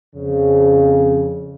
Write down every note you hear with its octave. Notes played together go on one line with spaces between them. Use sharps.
F2 C#3